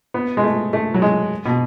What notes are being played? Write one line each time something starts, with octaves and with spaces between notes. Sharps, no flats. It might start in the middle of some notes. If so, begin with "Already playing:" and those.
B3
G#3
A3
A3
F#3
G#3
B2